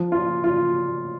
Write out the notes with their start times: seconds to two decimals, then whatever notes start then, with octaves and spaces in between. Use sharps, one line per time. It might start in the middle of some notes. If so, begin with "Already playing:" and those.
Already playing: F3
0.12 F4
0.44 F4